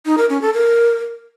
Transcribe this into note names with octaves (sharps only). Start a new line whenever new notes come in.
D#4
A#4
C#4
A4
A#4